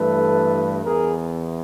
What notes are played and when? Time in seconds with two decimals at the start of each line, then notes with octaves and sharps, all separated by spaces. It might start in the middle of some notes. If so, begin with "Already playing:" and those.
Already playing: G2 E3 A3 A4 B4
0.84 E2 G#4 A#4